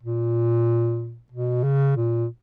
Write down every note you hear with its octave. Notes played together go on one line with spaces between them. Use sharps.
A#2
B2
C#3
A#2